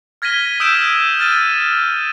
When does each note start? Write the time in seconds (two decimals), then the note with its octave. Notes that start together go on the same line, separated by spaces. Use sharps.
0.22 F6 G#6 A#6 B6 D#7 G7
0.60 D#6 E6 G6 B6 D7 E7
1.19 F6 A6 D#7